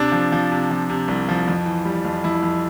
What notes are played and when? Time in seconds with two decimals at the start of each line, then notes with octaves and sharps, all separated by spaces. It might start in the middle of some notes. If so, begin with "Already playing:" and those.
Already playing: C3 D4
0.12 F3
0.32 F3
0.52 C3
0.71 F3
0.90 C3
1.08 C2
1.29 F3
1.48 F2
1.66 E3
1.85 G3
2.05 F2
2.24 F2 E4
2.43 F2